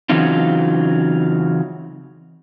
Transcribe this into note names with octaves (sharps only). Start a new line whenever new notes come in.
C#3 E3 F#3 C4 D#4 F4